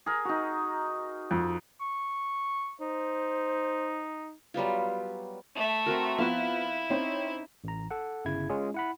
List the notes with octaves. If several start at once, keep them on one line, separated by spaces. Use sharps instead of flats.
G#4 A#4
D#4 F#4
F2
C#6
D#4 C5
F#3 G3 B3 F4
A3 E5
C4 F#4 A#4
F3 B3 E4 F5
C4 C#4 D#4
A1 A#5
A4 F#5
G1 C#3 E4 G#6
G#3 C#4 F4 G#4
E4 F#5 B5